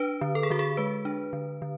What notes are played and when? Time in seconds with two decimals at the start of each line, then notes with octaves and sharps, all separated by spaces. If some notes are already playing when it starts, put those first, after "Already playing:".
Already playing: D4 B4
0.21 D3
0.35 A4
0.43 G#4
0.50 D3 F#4
0.59 G#4
0.77 G#3 B4
1.05 D4
1.33 D3
1.62 D3